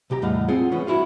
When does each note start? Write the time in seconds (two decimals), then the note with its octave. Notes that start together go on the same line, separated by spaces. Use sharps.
0.10 B1 C3 G4 G5 A#5
0.22 E2 A2 G3 D#5 F5 F#5
0.48 G#3 C4 F4 G#4 F#5
0.72 E3 B3 C#4
0.87 G2 E3 E4 F#4 F5